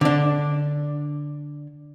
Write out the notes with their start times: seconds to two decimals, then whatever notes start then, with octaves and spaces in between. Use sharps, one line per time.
0.01 D3 D4